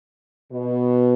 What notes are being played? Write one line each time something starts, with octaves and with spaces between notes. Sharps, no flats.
B2